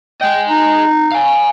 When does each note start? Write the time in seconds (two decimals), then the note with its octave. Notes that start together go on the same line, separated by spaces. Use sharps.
0.21 G#4 D#5 G5
0.48 D#4
1.11 F5 G#5